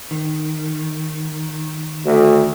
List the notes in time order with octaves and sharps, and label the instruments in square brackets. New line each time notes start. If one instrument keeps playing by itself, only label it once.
[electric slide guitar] D#3
[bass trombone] D2